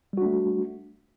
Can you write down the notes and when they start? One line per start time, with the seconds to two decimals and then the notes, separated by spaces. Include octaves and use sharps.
0.13 G3
0.17 F#4
0.22 D4
0.26 A3